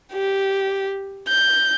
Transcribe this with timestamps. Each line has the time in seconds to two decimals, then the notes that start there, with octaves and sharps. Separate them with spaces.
0.13 G4
1.28 G6